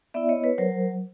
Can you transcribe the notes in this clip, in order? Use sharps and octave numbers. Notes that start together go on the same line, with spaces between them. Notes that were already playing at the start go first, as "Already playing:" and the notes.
B3 E4 D5 E5
C#5 D#5
B4 C#5
F#3 A#4 C5